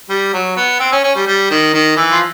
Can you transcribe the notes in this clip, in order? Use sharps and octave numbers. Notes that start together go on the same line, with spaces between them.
G3
F#3
B3
C4
C#4
C#4
G3
G3
D#3
D#3
E3
F3